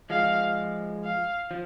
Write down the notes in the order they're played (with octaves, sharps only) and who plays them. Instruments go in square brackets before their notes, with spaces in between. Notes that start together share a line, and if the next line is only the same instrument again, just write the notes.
[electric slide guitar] F3 G#3 [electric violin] F5
[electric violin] F5
[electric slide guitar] F3